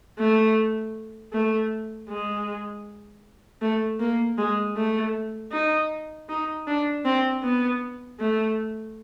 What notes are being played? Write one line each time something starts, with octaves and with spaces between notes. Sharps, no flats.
A3
A3
G#3
A3
A#3
G#3
A3
D#4
D#4
D4
C4
B3
A3